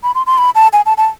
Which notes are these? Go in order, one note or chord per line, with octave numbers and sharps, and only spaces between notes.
B5
C6
C6
B5
A5
G#5
A5
A5